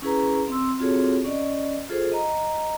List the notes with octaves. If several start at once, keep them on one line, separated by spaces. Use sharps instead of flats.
C#4 E4 G#4 B4 A#5
C4 C6 E6
C4 F4 F#4 G#4 A4 C#5
C#4 D5 D#5
F4 G#4 A4 C5
D#5 A#5